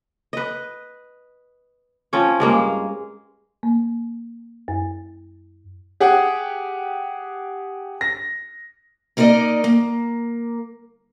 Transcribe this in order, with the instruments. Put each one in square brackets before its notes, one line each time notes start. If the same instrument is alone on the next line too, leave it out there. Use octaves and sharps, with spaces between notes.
[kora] B4 D#5
F3 C4 C#4 C#5
G2 G#3 A#3
[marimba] A#3
F#2
[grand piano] G4 G#4 F#5
A#6
[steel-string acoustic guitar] A#3 D#4 A#4 B4 D5 D#5
A#3